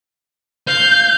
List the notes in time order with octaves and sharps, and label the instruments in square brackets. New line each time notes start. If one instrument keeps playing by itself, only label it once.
[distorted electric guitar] F5 [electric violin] G6